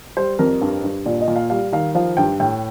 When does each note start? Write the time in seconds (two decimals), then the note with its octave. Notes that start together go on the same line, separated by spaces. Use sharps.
0.17 G3 C5
0.39 F2 A#4
0.62 G2
0.84 G2
1.06 A#2 D5
1.21 D#5
1.28 A#2
1.36 F5
1.50 G3 F5
1.72 D#3 F5
1.95 F3 F5
2.17 G2 G5
2.40 A2 G5